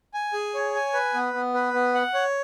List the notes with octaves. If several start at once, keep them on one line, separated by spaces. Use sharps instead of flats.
G#5
G#4
C#5
G#5
B4
B3
B3
B4
B3
F#5
C#5